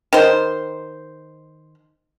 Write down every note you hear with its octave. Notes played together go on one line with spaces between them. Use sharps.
D#3 C5